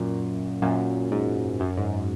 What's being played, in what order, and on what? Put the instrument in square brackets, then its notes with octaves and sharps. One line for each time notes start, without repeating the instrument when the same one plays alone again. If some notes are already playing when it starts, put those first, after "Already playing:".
Already playing: [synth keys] F#2 A#2
F#2 A#2
G#2
F#2
G#2